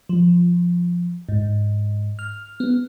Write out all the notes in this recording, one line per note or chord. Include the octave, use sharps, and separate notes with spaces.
F3
G#2
F6
B3